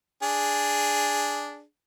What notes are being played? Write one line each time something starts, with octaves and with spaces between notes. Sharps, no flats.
D4 G#4